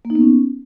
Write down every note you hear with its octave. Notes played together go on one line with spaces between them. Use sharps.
A#3
D#4
B3
C#4